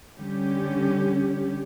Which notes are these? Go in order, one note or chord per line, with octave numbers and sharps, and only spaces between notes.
D3 G3 C#4 G4